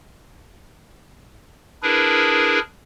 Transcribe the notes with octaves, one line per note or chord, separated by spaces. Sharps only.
D4 E4 G#4 A#4 B4